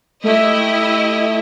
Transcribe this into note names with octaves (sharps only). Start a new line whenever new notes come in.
A3 E4 G4 D#5